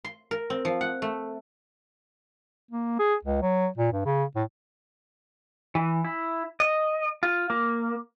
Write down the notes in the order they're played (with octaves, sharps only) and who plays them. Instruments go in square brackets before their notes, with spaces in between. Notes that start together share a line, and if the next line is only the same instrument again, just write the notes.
[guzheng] C6
A#4
C4
F3
F#5
A3
[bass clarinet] A#3
G#4
C#2
F#3
A#2
G2
C#3
A2
[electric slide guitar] E3
E4
D#5
F4
A#3